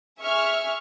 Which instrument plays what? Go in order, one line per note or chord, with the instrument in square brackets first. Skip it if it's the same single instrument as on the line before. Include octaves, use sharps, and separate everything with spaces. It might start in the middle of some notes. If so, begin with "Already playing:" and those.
[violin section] G#4 E5 C#6 F6